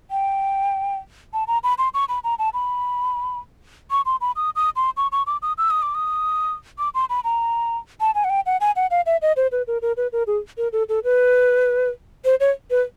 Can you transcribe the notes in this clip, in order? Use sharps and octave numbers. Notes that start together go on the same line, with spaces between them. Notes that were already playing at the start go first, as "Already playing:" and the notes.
G5
A5
A#5
B5
C6
C#6
B5
A#5
A5
B5
C#6
C6
B5
D#6
D#6
C6
C#6
C#6
D6
D#6
E6
D#6
D6
D#6
D6
C6
B5
A#5
A5
G#5
F#5
G5
F#5
G#5
F#5
F5
E5
D#5
C5
B4
A#4
A#4
B4
A#4
G#4
A#4
A4
A4
B4
C5
C#5
B4